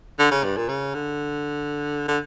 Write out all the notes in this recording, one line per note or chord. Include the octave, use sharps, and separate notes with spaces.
D3
C#3
G2
A#2
C#3
D3
D3